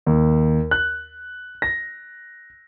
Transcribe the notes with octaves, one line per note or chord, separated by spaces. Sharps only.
D#2
F#6
A#6